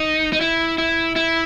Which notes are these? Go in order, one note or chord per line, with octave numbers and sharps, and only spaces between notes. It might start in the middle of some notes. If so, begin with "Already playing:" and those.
Already playing: D#4
D#4
E4
E4
E4